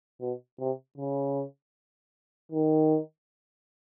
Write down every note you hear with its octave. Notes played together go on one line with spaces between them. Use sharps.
B2
C3
C#3
D#3